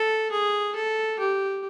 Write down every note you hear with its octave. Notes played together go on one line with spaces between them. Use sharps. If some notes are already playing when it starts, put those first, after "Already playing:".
Already playing: A4
G#4
A4
G4